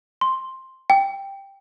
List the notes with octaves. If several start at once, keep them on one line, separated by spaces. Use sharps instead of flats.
C6
G5